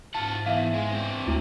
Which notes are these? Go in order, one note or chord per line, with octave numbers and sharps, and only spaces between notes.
G#2 F4 F#5 A5
E3 B3 E5 F5
G#3
C4 D4
D2 E4